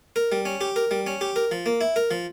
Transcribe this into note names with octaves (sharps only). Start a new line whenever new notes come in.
A#4
G3
C#4
G4
A#4
G3
C#4
G4
A#4
F3
A#3
E4
A#4
F3